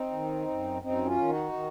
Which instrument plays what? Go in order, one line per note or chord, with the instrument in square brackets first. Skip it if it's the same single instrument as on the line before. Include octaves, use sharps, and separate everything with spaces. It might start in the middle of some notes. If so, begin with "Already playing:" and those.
Already playing: [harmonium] C4 D#4
D#3
F#2
F#2 C4 D#4
C#4 F4
D#3
D#4 F#4
D#3